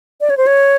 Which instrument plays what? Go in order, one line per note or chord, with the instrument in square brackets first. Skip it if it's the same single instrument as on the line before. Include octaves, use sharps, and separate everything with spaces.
[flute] D5
C#5
C5
C#5